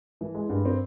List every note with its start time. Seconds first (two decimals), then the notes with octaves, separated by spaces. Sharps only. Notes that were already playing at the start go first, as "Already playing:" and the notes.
0.21 E3
0.35 G#3
0.49 G2
0.65 C4